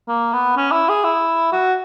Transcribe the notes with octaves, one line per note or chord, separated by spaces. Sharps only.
A#3
B3
C#4
E4
G#4
E4
F#4